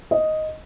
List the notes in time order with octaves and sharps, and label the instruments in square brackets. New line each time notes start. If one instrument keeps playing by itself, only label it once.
[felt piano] D#5